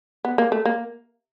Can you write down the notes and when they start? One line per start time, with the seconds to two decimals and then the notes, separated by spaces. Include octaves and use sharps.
0.25 B3
0.38 A#3
0.52 A3
0.65 A#3